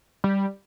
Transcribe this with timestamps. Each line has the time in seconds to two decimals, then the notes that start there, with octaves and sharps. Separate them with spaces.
0.24 G3